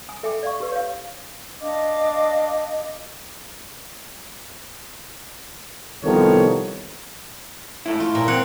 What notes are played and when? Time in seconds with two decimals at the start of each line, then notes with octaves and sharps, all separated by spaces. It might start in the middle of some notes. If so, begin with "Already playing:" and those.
0.09 G#5 D#6
0.23 A4 E5 G5 G#5 D6
0.43 D5 F5 C#6
0.60 G4 B4
0.72 C#5 F5
1.61 D4 D#5 F5 D6
6.04 C2 D#3 F3 B3 A4 C#5
7.86 G#2 A3 E4
8.00 F4
8.15 A#2
8.28 C4 C#5 F#5